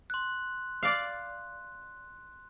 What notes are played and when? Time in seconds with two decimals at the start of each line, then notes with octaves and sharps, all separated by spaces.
0.10 C6 F#6
0.83 D5 F5